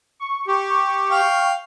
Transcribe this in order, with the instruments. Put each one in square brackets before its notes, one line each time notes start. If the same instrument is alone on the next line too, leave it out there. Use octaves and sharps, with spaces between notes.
[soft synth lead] C#6
[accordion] G4
[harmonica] F5 G5